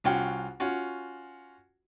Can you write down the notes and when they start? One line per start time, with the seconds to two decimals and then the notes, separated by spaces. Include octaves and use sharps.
0.04 C2 C#4 F4 F#4 G5
0.60 C#4 F4 F#4